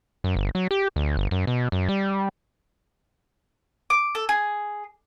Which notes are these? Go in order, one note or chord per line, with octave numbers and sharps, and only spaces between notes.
F#2
G1
F#3
G4
D2
G1
F#2
B2
F#2
G3
D6
A4
G#4